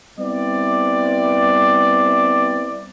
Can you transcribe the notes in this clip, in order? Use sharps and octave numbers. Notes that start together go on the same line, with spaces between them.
G3 B3 C4 E4 D5